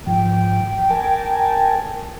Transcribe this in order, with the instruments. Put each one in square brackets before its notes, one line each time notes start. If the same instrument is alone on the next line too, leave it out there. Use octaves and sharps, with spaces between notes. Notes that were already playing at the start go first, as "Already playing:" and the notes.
[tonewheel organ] G#2 F3 [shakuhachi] G5
[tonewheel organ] A#4 G#5 A5